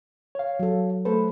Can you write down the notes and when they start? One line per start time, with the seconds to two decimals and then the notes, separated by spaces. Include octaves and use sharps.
0.35 C#5 F5
0.59 F#3 A4
1.05 A3 A4 B4 C5